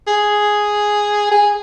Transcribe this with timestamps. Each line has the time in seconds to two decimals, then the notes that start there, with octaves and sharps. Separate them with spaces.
0.07 G#4
1.31 G#4